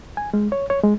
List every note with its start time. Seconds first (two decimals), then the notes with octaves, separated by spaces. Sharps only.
0.17 G#5
0.34 G#3
0.52 C#5
0.70 C#5
0.84 G#3